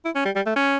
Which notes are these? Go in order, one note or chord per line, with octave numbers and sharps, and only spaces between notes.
E4
C#4
G3
G3
A3
C#4